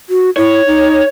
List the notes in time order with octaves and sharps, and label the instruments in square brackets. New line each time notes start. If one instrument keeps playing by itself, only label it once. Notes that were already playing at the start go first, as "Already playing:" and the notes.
[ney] F#4
[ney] E4 [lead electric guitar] C#5
[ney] D#4